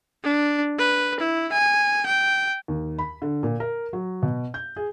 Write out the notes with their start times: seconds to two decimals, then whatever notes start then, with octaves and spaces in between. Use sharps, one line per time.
0.24 D4
0.79 B4
1.20 E4
1.52 G#5
2.06 G5
2.68 D#2
2.99 B5
3.22 D3
3.43 A#2
3.60 A#4
3.93 F#3
4.22 B2
4.54 G6
4.76 G#4